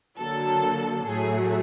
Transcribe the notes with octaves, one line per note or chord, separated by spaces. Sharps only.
D3 F#3 A#3 A4
A2 F#3 A3 G#4